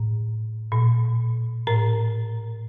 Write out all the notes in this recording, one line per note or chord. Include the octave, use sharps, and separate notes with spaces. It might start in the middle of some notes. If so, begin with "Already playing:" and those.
Already playing: A2
A#2
A2 A#4